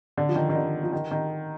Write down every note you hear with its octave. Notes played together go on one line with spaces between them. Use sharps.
D3
F3
D#3
D#3
D3
F3
D#3
D#3